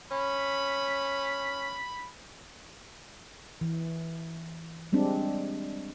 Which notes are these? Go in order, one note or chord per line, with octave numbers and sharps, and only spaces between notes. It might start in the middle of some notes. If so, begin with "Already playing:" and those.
C#4 B5
E3
G3 G#3 C4 D4